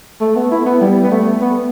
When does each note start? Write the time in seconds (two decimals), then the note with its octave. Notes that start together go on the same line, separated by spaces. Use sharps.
0.21 A3
0.36 B3
0.51 E4
0.66 B3
0.81 G3
1.03 B3
1.11 A3
1.41 B3